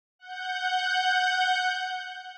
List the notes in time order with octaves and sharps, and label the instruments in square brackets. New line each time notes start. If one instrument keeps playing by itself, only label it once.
[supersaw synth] F#5 G6